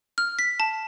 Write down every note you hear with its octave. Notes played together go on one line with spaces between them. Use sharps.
F6
B6
A5